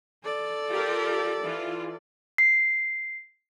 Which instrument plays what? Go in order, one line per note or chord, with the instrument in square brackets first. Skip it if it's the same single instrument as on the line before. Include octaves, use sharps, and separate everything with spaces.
[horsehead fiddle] A4 D5
[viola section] F4 G4 A#4
E3 F4
[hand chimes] C7